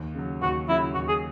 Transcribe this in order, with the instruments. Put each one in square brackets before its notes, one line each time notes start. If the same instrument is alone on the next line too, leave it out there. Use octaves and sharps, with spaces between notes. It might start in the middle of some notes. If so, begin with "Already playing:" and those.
Already playing: [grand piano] D#2
C#3 F#3
[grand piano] D#2 [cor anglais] F#4
[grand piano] C#3 F#3 [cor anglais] E4
[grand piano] D#2 [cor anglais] F#4
[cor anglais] G#4